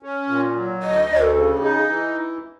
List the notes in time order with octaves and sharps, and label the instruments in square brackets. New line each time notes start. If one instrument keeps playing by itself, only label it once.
[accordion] C#4
A#2
F#3
[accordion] D2 [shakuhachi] D#5
[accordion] D2
[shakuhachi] A4
[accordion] C#3
[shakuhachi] G4
[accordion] D#4 [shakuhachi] G#4
[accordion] E3